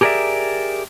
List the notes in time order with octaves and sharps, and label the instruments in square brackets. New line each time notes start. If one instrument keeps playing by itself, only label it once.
[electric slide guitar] G4 G#4 A#4 C#5 D5 E5